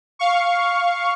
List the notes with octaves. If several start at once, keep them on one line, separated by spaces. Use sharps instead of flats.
F5 C#6